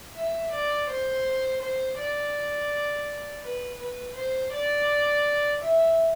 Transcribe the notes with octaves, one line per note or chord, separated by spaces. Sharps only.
E5
D5
C5
C5
D5
B4
B4
C5
D5
E5